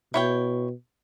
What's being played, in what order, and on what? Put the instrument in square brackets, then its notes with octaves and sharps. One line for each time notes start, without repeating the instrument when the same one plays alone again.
[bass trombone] B2 [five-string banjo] E4 C#5 G5